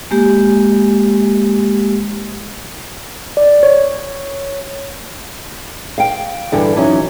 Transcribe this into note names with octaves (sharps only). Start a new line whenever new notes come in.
G#3 A#3 G4
D5
C#5
F5 G5
G2 D3 E3
E3 F#3 C#4 D#4